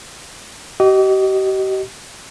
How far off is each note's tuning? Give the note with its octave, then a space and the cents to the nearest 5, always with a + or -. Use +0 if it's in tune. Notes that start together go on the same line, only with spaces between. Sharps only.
G4 -40 D#5 +0